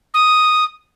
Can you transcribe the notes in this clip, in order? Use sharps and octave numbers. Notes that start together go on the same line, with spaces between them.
D#6